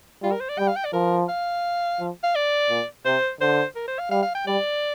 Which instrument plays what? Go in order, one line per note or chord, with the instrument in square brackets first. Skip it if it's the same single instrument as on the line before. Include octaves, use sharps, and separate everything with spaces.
[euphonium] G3 [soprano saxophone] F4
[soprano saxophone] A#4
C5
D5
[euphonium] G3 [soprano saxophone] G5
[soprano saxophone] F5
G5
D5
[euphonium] F3 [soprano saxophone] A#4
[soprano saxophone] F5
[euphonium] F3
[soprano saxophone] F5
D5
[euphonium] A#2
[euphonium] C3 [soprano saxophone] C5
[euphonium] D3 [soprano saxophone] C5
[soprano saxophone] A#4
C5
F5
[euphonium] G3 [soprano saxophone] F5
[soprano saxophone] F5
G5
[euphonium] G3 [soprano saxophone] D5